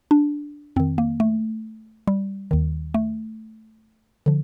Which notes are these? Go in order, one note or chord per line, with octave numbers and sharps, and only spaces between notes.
D4
F2 D#3 C4
A#3
A3
G3
D#2 D#3
A3
D3 F3